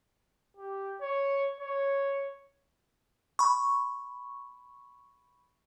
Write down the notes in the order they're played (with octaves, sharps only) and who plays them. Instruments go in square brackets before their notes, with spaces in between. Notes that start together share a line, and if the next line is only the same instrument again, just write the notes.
[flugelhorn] G4
C#5
C#5
[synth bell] B5 C#6